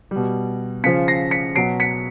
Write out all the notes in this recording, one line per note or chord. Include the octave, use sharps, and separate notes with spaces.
B2 G3
C#3 F3 B6 C#7
A#6 C7
B6 C#7
B2 F#3 C7 D7
B6 C#7